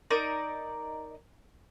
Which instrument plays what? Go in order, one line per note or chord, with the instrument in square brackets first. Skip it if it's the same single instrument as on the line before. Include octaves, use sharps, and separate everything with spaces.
[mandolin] D#4 A#4 D5